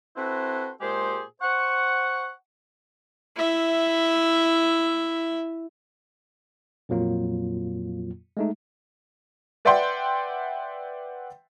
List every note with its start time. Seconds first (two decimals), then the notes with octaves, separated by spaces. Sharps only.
0.16 C4 E4 F#4 A4 B4 C5
0.80 A#2 G#3 G4 G#4 C5
1.41 C5 F#5 C#6
3.36 E4 E5
6.89 F2 A#2 F#3 A#3 F4
8.37 G#3 A3 D#4
9.65 B4 D5 E5 F#5 G5 C6